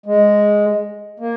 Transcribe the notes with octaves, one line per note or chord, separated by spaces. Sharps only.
G#3
A#3